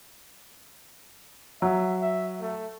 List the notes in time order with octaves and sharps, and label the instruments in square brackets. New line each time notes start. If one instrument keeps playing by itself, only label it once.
[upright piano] F#3 [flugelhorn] E5
[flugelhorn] E5
A3